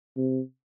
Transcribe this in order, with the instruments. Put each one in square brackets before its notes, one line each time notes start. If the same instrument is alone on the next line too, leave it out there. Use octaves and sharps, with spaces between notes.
[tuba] C3